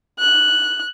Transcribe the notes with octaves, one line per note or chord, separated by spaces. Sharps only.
F#6